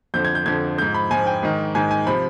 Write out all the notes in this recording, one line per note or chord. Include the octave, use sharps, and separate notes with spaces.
F2 D3 F3 G6
G#6
G6
F2 D3 F3 G#6
G#2 F3 G6
B5
G#2 F3 G#5
G5
G#2 D#3
G#2 D#3 G#5
G#5
C3 F3 B5